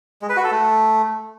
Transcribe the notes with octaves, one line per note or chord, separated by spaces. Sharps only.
G#3
B4
F#4
A4
A3